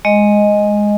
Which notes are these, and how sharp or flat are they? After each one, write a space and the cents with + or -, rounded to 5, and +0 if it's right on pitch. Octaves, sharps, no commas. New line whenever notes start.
G#3 +0 D#5 +0